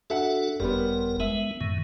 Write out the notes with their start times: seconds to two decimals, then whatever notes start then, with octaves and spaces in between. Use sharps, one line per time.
0.10 D4 F#4 A4 E5 F#5
0.60 F#1 F2 G3 B3 A#4
1.20 G#3 B3 E5
1.61 F#2 A2 D#3